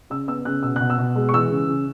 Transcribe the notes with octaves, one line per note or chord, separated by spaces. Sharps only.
C#3 E6
B3 E6
C#3 F#6
B2 E6
B2 F#6
E6
B2
G#3
C#6
E3 E6
C#3
C#3